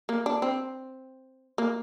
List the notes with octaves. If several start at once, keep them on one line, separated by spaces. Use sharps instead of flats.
A#3
D4
C4
A#3